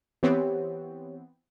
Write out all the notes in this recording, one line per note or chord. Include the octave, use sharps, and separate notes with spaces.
E3 B3 C4 G4 C#5